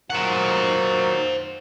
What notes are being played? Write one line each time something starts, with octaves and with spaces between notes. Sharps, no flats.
A#2 D#3 F#3 C5 F#5